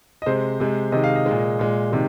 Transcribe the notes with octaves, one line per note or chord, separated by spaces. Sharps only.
D#5
C3 G#3 C5
C3 G#3
C3 D#3 G#3 D#5
F5
D#5
A#2 G#3
A#2 G#3
C3 D#3 G#3